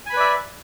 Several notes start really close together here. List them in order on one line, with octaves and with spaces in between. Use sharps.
G#5 B5 B4 D5 E5